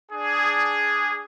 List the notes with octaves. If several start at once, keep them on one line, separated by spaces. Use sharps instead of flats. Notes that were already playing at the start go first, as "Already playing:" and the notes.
D4 G#4